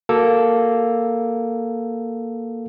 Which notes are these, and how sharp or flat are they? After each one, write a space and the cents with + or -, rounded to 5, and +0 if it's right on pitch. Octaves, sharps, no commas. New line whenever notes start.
A#3 +0 F#4 +0 A4 +0